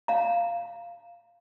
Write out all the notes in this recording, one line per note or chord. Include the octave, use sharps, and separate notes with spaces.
F5 A#5